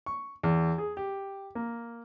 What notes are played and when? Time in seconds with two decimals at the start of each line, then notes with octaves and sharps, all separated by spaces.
0.06 C#6
0.43 E2
0.78 G#4
0.97 G4
1.55 A#3